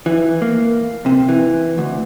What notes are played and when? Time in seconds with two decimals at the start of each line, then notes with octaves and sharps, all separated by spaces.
0.06 E3
0.42 A#3
1.06 C3
1.29 E3
1.78 D2